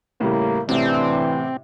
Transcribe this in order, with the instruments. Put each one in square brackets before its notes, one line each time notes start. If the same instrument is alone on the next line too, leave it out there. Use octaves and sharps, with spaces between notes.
[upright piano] A2 C#3 G3 [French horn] A#3
[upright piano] A1 A2 C3 [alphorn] E3 [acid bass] C4 [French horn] D4